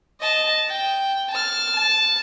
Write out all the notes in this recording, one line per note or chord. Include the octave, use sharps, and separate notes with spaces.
D#5 A5
G5
A5 F6
A5